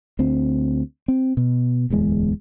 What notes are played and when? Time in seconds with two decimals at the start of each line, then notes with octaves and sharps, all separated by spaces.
0.19 D2 C4
1.08 C4
1.37 B2
1.90 D1 E2 G#3